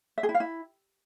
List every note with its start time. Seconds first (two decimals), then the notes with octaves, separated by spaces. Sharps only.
0.18 E5
0.23 G#4
0.29 E4
0.35 F5
0.40 E4